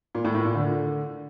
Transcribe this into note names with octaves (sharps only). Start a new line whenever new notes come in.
A#2
A2
A2
A#2
D3